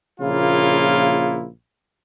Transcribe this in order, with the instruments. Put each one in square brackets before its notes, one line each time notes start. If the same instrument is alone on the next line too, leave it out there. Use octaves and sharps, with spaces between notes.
[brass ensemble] A#1 C#3 A#3 E4 F4